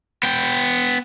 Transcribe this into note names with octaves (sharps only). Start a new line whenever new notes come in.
B3 G5